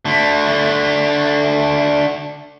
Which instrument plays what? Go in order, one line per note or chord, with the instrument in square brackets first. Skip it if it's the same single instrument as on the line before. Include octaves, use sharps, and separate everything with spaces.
[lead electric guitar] D3 A3